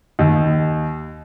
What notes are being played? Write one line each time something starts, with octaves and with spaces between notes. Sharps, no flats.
D#2